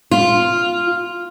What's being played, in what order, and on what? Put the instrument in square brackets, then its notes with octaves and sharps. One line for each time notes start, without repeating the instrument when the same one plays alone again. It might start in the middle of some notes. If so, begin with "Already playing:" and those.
[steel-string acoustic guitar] F4